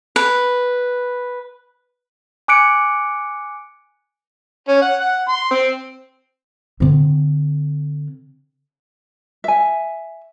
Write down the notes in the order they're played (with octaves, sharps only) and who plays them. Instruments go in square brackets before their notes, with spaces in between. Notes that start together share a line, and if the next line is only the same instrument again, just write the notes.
[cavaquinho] B4
[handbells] G#5 D6 F#6 C#7 D7
[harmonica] C#4
F#5
F#5
C6
C4
[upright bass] D3 C4
[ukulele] E5 G#5